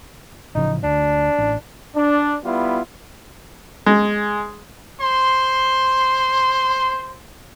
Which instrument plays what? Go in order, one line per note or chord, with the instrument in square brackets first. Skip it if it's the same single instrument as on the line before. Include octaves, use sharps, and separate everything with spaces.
[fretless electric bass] A1 C#3 F3 [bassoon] D#4
[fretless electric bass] D2 [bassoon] D4
[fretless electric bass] A1
[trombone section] D4
G3 B3 E4 F4
[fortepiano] G#3
[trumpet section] C5 C6